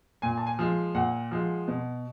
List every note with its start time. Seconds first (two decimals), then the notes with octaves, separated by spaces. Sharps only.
0.22 A#2 G#5
0.38 A5
0.46 G#5
0.59 F3 G#3
0.95 A#2 F#5
1.31 F3 G#3
1.68 B2